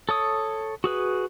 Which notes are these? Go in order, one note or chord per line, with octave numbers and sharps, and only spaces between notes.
A4 C#5 D#6
F#4 G#4 B4